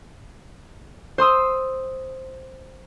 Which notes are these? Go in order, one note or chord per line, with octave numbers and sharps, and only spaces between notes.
C5 C6 D#6 E6